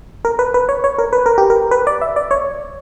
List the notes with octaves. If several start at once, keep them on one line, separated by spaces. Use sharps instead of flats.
A#4
B4
B4
C#5
C#5
A#4
B4
A#4
G4
A#4
B4
D5
E5
D5
C#5